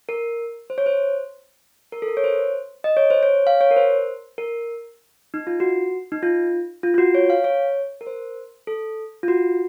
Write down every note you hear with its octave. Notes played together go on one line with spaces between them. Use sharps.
A#4
C5
C#5
C5
A#4
A4
A#4
C#5
C5
D#5
C#5
C5
C#5
F5
C#5
A#4
C5
A#4
D#4
F4
F#4
D#4
F4
F4
F4
F#4
C#5
F5
C#5
A#4
C5
A4
F4
F#4